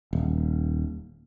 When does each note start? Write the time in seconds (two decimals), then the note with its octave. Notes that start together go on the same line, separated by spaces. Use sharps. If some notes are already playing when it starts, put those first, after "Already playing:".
0.13 D#1